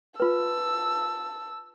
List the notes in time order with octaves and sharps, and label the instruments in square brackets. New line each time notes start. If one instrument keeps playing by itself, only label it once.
[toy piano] F4 B4 [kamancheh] A5 E6